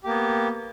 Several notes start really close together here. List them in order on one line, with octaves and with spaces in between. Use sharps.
G4 A#3 B3